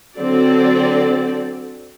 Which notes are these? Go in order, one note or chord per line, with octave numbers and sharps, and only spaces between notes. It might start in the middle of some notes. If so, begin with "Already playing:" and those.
D3 F#3 C4 A4 D5